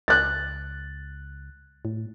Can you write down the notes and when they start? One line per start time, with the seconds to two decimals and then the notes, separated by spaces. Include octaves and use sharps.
0.08 C#2 F#6 A6
1.85 A2